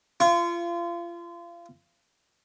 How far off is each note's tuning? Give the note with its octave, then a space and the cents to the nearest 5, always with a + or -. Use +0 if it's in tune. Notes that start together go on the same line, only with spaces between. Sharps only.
F4 -30 C#6 +5